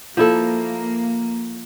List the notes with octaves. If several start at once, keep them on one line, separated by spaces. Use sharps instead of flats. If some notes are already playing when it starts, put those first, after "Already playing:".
F3 A#3 E4 A4